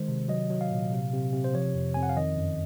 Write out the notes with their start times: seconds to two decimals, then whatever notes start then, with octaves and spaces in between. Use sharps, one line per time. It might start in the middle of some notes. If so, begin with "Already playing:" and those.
Already playing: D#3 G#3 C5
0.08 C3
0.28 F#3 D#5
0.50 F#3
0.61 F5
0.71 A#2
0.92 C3
1.13 C3
1.33 C3
1.44 C5
1.54 F3 C#5
1.74 F2
1.94 F2 G#5
2.03 F#5
2.09 F5
2.17 D#3 D#5
2.37 F#2